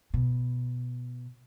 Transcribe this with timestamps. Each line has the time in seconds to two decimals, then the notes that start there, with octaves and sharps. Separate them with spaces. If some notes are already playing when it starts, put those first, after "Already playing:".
0.14 B2